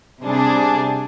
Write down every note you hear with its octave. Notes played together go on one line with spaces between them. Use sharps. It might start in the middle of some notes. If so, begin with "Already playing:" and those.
C3 G3 D4 G#4